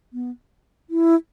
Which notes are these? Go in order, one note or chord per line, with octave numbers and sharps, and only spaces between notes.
B3
E4